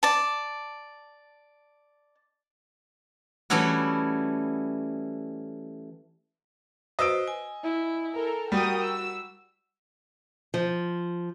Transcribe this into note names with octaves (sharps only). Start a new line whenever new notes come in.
D5 A5
E3 G3 A3 C#4 E4 F#4
F#4 B4 C5 D#5 E6 D7
G#5
E4
A4 A#4
G3 F#4 A#4 G5 D#6
E6
F3